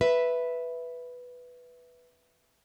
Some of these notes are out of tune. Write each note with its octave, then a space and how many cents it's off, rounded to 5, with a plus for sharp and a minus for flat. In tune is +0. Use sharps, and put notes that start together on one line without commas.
B4 +0 E5 +0